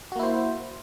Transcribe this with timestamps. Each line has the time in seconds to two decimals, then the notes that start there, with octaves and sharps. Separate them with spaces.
0.12 F#4
0.16 A#3
0.19 E4
0.23 C5